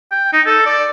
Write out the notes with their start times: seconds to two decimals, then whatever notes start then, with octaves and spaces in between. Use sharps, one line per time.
0.11 G5
0.33 D#4
0.46 A4
0.66 D5